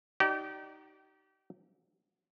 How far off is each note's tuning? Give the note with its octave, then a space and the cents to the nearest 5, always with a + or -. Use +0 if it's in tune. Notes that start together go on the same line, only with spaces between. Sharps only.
D#4 +0 G4 -35 D5 +0